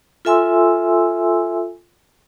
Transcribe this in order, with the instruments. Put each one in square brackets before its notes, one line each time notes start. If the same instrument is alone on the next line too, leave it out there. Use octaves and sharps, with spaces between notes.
[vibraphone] F4 A4 E5 G#5 C6 E6